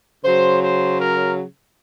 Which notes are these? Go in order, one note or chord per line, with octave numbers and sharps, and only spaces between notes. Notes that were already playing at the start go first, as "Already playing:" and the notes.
C#3 F#3 C5
C5
A#4